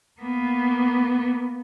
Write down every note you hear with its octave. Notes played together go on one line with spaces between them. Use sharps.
A#3 B3